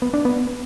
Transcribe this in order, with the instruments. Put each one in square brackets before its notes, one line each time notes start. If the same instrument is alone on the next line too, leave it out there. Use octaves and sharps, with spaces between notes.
[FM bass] B3
D4
B3